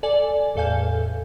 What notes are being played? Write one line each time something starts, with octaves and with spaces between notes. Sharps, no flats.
A4 D5 G#5
E2 A2 A4 F5 G#5 G6